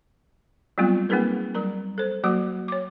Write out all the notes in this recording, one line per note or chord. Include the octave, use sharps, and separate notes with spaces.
F#3 G3 A3 B3 C4 F4
A#3 C4 D#4 G#4 A#4 B4
F#3 G3 A#4 A#5
A4 C5
F#3 A#3 F#4 F#5 D6
C#5 D6